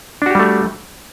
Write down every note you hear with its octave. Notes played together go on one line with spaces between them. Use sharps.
G3 A3 D4 F#4 G4